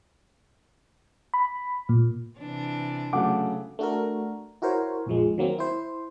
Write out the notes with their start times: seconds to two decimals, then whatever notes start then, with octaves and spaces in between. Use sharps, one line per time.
1.34 B5
1.89 A#2
2.39 C3 E3 D4
3.13 C#3 F#3 A3 F#5 D6
3.79 A3 D4 F#4 A4 A#4
4.62 E4 F#4 A#4 C5 C#5
5.06 A#1 F2 F3 G#3
5.38 D#3 F#3 A#3 C4
5.59 E4 C5